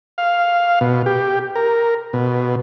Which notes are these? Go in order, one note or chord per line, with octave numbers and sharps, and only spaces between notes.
F5
B2
G4
A#4
B2